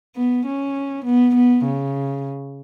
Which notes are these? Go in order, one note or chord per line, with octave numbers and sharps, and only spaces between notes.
B3
C#4
B3
B3
C#3